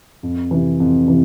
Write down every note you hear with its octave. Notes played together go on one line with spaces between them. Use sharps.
F2
C3 E3
F2
C3 E3